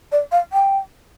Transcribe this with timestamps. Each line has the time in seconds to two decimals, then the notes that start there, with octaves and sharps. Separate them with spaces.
0.12 D5
0.32 F5
0.53 G5